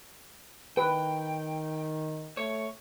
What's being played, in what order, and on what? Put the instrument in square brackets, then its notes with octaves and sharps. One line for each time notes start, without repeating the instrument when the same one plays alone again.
[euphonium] D#3 [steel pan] B4 [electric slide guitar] G5
[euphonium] A3 [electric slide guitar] C#5